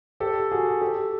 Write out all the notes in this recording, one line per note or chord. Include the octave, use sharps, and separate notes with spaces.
G4 A4
F#4 G#4
G4 A4